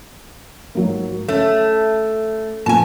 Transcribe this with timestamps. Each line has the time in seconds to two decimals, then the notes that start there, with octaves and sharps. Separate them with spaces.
0.75 G#2 F#3 A#3
1.28 A3 C#4
2.66 A#2 F3 B3 G#5 A5